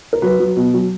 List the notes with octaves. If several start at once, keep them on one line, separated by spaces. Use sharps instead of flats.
A#4
F#3 B4
F#3
B2
F#3